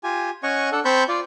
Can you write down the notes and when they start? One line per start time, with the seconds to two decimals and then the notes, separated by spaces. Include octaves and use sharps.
0.04 F4 G4 G#5
0.43 C#4 C#5 D#5 F#5 G#5 C#6
0.72 D4 A4 F#5
0.85 C4 C5 A5 B5 C#6 G6
1.08 F4 D5